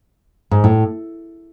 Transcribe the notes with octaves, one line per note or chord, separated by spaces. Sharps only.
G#2
A2